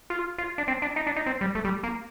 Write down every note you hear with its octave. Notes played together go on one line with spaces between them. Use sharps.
F4
F4
D4
C4
D4
D#4
D4
D#4
C4
G3
A3
G3
A#3